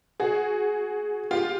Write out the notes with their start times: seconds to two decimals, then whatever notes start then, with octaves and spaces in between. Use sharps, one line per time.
0.20 F#4 G#4
1.31 F4 G4